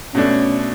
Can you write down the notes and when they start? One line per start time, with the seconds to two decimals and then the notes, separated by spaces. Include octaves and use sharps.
0.15 B2 A3 C#4 D4